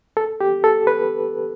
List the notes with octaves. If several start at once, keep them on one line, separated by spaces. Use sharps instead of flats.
A4
G4
A4
B4